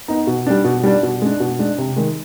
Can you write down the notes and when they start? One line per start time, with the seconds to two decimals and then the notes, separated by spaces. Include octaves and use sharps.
0.08 B3 D#4
0.27 B2
0.47 G3 D4
0.65 B2
0.84 G3 D4
1.03 B2
1.22 G#3 D4
1.40 B2
1.59 G#3 D4
1.78 C3
1.96 D#3 G#3